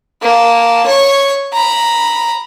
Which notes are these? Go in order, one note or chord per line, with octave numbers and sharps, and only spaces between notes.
A#3 A5
C#5 C#6
A#5 B5